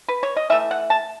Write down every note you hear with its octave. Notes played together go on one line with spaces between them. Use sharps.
B4
C#5
D#5
E3 A3 E5
F#5
A5